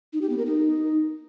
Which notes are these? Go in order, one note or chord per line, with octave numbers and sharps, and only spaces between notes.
D#4
G4
B3
A#4
D#4